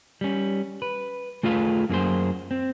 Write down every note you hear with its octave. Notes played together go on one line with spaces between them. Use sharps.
G3 C#4
B4
A3 F4 G#4 B4 F5
F#2 A#3 C#4 G#4 C5
C4